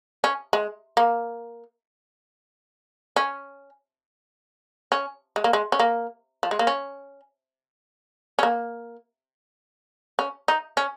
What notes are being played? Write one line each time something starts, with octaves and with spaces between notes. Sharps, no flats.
C#4
G#3
A#3
C#4
C#4
G#3
A#3
G#3
C#4
A#3
F3
G#3
A#3
C#4
C#4
A#3
C#4
D#4
C#4